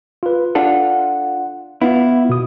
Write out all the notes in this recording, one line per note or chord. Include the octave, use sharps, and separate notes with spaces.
F4 B4
D4 F4 A4 F#5
B3 E4 F4
B2 D#6